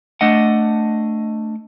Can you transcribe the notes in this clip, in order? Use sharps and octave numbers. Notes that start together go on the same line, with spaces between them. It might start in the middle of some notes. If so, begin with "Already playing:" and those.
A3 D4 D#5 F#5